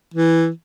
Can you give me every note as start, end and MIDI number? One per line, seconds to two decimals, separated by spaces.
0.14 0.49 52